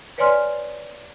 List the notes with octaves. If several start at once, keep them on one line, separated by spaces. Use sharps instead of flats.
B4 C#5 D5 G#5 C6 F6